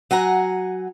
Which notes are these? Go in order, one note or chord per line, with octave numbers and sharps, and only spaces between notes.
F#3 F#5 G#5 A#5